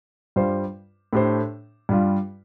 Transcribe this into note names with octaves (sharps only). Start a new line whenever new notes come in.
G2 G3 F4 C5
A2 A3 D4 G4 C5
G2 G3 F4